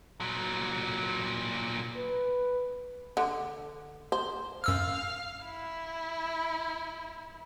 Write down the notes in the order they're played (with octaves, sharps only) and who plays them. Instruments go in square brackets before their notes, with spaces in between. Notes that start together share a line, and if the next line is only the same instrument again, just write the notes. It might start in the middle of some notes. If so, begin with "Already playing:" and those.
[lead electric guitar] A#2 F#3
[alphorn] B4
[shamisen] D3
C5
[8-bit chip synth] F#2 E6 F6 [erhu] F5
[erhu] E4